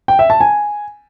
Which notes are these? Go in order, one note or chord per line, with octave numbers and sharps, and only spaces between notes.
G5
E5
A5
G#5